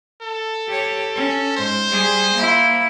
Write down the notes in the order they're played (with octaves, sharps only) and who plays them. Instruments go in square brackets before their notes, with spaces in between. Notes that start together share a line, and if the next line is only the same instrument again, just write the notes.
[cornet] A4
[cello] G4 C#5
C#4
[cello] G#2 [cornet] C5
[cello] G3 G#4
A#3 E4